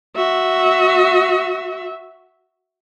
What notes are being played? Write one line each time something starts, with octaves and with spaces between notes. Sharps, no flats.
F#4 E5